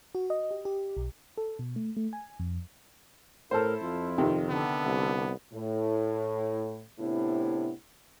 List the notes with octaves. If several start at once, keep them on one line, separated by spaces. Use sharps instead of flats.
F#4
D#5
G4
G4
B1
A4
B2
A3
A3
G#5
F2
A2 E4 A4 A#4 C5
F2 F4
C3 D#3
D3 B3
C2
A2
A2 C3 B3 D4 E4